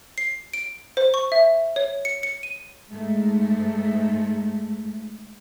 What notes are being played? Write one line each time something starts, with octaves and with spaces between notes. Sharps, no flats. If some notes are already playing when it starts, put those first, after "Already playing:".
C7
D7
C5
C#6
E5
C#5
C#7
C#7
D#7
G#2 G#3 A3